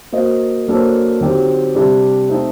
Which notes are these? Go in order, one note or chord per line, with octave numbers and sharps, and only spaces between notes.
A#3 F#4 C5 D#5
F#3 A#3 D4 A4 C5
D3 F#3 C4 D#4 G4
C3 G3 D4
A3 C4 D#4